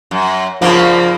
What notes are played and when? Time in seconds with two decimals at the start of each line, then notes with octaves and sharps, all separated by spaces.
0.11 F#2
0.62 G2 C#3 F3 A#3